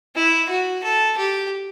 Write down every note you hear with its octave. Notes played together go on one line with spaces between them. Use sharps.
E4
F#4
A4
G4